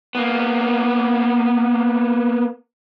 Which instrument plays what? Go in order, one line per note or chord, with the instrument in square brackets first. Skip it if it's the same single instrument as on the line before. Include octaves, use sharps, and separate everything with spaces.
[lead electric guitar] A#3 B3